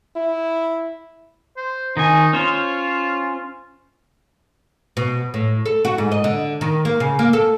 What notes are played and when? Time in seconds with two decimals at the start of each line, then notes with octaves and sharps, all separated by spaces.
0.16 E4
1.57 C5
1.97 D#3 D#4 G#5
2.33 C#4 F4 C5 C#5
4.97 B2
5.34 A2
5.66 A4
5.85 F#4
5.98 G#2
6.12 D#5
6.24 D3
6.61 D#3
6.85 A#3
7.00 C#3
7.19 A#3
7.33 A4